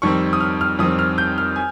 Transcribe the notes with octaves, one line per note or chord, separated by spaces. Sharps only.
F2 D#3 G3 C4 C#6
D#6
F6
F6
F2 D#3 G3 C4 D#6
F6
G6
F6
G#5